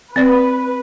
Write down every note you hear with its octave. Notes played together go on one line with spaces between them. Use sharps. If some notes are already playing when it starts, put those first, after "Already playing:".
C4 B4 D5